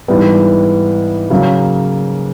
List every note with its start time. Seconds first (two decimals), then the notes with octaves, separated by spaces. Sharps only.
0.08 G#2 E3 G3 B3
1.30 C#3 F#3 A#3